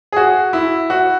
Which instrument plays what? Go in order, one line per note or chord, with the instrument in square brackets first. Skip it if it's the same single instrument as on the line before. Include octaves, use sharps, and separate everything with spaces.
[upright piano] G#4
F#4
E4
F#4